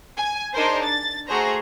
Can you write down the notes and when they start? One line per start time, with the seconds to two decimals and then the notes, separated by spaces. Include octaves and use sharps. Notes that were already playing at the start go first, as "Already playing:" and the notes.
0.17 G#5
0.53 D4 D#4 G#4 A#4 C5
0.83 A6
1.28 A3 F#4 G#4 C5 A#5